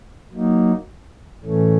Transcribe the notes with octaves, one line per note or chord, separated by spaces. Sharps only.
F#3 A#3 D#4
A2 E3 A3 C#4